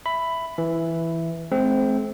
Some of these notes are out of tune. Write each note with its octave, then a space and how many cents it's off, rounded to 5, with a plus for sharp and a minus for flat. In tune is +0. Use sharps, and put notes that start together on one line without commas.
E5 +0 B5 +10
E3 +0 E5 +0
A3 -45 C4 +0